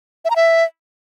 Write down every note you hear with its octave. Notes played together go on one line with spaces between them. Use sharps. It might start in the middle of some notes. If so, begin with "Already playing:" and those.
E5
A#5
E5